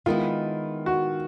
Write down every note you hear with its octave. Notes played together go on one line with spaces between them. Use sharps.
D#3 G#3 B3 E4 F4
F#4